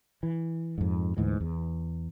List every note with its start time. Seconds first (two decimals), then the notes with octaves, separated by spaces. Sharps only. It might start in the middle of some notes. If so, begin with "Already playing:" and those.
0.23 E3
0.78 F2 G#2
1.17 D2 G#2 E3
1.40 E2